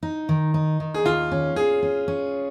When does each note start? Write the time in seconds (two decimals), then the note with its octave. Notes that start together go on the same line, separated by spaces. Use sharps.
0.03 D#4
0.29 D#3
0.54 D#4
0.80 D#3
0.94 G#4
1.05 D#2 F4
1.31 C#4
1.56 C#4 G#4
1.82 C#4
2.08 C#4